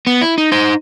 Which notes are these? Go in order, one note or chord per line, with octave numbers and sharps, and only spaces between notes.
B3
E4
D#4
D#4 C5